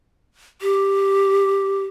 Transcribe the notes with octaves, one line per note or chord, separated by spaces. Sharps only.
G4